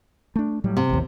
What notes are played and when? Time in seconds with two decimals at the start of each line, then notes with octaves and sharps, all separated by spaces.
0.36 A3 D4
0.64 A2 F#3 G3
0.77 C3
0.89 A1 D#2